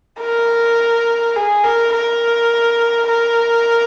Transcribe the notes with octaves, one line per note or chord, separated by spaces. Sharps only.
A#4
G#4
A#4
A#4
A#4